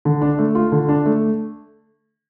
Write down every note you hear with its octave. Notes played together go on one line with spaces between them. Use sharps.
D3
D4
A3
F4
D3
D4
A3